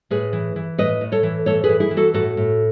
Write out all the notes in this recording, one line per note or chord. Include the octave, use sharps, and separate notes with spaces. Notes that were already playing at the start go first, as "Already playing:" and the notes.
A2 G#4 B4
E3
E3
A2 B4 D#5
A2
A4 C#5
E3
A2 A4 C#5
G#4 B4
E3
E4 G#4
E3
F#4 A4
A2 F#4 A4
A2